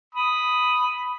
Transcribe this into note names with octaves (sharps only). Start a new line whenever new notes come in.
B5 D#6